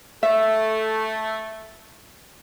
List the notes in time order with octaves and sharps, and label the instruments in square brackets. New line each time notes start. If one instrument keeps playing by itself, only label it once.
[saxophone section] A3 [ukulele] E5